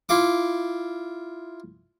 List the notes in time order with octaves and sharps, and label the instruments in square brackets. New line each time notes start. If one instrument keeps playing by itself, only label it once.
[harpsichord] E4 F4 D6